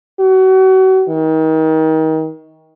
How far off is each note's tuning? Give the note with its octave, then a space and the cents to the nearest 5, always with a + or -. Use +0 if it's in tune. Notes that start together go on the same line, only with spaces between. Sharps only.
F#4 +35
D#3 +30